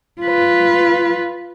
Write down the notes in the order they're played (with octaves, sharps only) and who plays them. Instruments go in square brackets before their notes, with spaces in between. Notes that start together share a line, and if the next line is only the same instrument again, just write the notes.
[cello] F4 B4